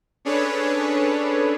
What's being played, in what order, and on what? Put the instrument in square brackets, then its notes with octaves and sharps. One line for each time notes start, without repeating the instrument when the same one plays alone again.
[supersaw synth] C#4 D4 G#4 A4 B4 C#5